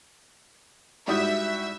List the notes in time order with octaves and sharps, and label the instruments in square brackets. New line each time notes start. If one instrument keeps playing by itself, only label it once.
[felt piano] G#2 D#6 G6 [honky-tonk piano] G3 F#4 [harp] E4 D5 [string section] E5